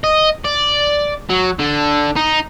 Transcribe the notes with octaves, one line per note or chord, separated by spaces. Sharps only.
D#5
D5
F#3
D3
D#4